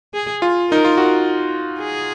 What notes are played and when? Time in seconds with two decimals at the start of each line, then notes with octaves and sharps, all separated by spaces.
0.14 G#4
0.42 F4
0.70 D#4 A#4
0.85 F4
0.97 F#4
1.80 G#4